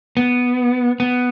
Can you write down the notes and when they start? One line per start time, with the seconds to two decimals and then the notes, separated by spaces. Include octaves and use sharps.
0.17 B3
1.00 B3